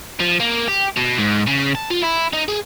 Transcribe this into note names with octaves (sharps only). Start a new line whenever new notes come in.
F3
A#3
G4
B2
G#2
C#3
A5
F4
E4
D#4
G#4